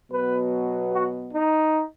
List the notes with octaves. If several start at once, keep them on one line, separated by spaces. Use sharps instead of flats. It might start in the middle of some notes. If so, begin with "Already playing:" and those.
B2 F#3 B3 B4
F#4
D#4